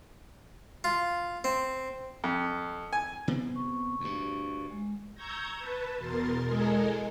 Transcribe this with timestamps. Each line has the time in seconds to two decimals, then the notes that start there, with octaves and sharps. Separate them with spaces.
0.84 F4
1.44 C4
2.24 F2
2.93 G#5
3.28 C3 B3 C4
3.56 C#6
4.00 D2 G2
4.71 G#3
5.15 A#5 C#6 E6 G6 G#6 A#6
5.59 B4 A5
5.98 E2 B2 A#4 C6 A6
6.45 E2 G#3 A4 A#4 D#5 G#5